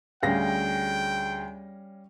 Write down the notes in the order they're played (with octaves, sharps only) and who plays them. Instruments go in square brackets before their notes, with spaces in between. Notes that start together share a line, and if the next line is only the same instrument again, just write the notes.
[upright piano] D2 G#4 A#6 [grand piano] G3 C#4 F5 [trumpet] G5